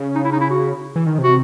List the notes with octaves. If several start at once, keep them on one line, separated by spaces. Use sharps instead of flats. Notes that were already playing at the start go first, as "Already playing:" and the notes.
Already playing: C#3
D#4
E4
D#4
E4
F#4
E3
D#3
C3
F#4